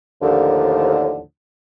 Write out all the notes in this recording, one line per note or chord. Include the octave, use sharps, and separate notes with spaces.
D#2 A2 D3 F3